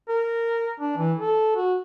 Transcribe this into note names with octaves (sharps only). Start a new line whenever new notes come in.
A#4
D4
E3
A4
F#4